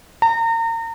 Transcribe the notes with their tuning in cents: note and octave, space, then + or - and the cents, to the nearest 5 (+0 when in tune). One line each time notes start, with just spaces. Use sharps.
A#5 -35